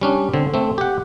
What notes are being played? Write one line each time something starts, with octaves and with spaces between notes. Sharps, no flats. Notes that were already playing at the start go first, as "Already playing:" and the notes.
G3 C#4 D4
D3 C4
A3 C4
G4 F#5